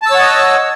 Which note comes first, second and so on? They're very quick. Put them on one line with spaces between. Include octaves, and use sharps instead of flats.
A5 E6 C#5 F#5 D#5